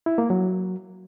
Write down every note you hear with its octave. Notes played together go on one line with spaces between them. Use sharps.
E4
A#3
F#3